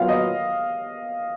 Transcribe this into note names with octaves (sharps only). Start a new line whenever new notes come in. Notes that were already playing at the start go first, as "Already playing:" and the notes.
Already playing: A#2 F#3 B3 F4 F5
D#5